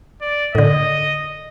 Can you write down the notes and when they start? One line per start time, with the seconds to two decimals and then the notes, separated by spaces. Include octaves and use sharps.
0.21 D5
0.55 A2 D3 D#5